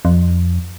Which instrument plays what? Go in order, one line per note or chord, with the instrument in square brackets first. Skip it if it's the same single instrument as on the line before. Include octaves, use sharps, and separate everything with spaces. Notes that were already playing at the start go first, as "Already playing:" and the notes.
[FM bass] F2